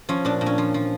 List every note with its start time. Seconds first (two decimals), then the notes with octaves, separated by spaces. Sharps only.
0.09 F3 C#4
0.25 A#2 D4
0.41 A#2
0.46 C#4
0.58 F3
0.74 F3